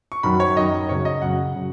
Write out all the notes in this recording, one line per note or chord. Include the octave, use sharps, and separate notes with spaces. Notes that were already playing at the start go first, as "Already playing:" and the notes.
C#6
F#2 D#3 F#3 B5
C#5
F#2 D#3 F#3 D#5
F#2 C#3 F#3 C#5
D#5
F#2 C#3 F#3 F#5
C#3 F#3